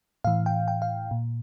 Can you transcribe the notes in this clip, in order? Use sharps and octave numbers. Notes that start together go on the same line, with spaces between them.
A2 E3 F5
G5
G5
F5
A#2